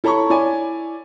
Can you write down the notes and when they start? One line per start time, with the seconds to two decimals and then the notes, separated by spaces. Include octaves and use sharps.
0.04 E4 A4 C#5 A#5 B5 C#6
0.30 E4 C#5 D5 G#5